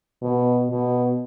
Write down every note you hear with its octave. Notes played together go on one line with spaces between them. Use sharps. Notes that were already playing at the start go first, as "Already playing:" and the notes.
B2
B2